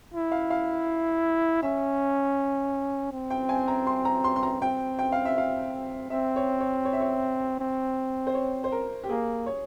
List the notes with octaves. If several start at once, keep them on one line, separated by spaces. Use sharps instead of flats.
E4
F5
F5
C#4 E5
C4
G5
G#5
A#5
C6
A#5
C6
C6
A#5
C4 G5
G5
F5
E5
F5
C4 E5
C#5
C#5
C#5
E5
C#5
C4
C5
C#5
C5
A#4
G4
A#3 G#4
C#5